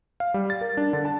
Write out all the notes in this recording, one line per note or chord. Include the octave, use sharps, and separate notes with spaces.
F5
G3
A6
A#4
D4
D3
A5